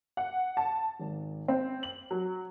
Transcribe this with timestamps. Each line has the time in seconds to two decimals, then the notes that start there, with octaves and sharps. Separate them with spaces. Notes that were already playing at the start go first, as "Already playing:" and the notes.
0.17 F#5
0.57 A5
1.00 G#1
1.48 C4
1.83 F#7
2.11 F#3